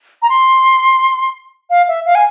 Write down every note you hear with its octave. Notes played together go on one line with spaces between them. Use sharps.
A#5
C6
F5
E5
F5
G#5